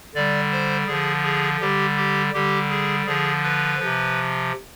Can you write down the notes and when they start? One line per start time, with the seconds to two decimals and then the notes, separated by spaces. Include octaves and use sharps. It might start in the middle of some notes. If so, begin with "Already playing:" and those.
0.14 D3 G3 D5
0.52 C5
0.87 D3 F3 G#4
1.24 G#4
1.61 D3 G3 G4
1.97 G4
2.34 D3 G3 G4
2.70 G#4
3.06 D3 F3 G#4
3.43 B4
3.79 F3
3.84 C3